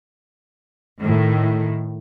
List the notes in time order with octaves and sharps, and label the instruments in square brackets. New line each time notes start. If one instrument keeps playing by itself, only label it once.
[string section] A2 D#3